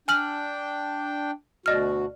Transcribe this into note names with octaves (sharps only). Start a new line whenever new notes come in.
D4 G5 G#5 F6 F#7
D2 B2 F#4 D5 D#5 F6